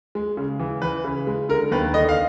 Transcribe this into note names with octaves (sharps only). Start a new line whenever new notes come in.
G#3
C#3
E3
E3 B4
C#3
G#3
D3 A#4
D#2 B4
D3 D#5
F5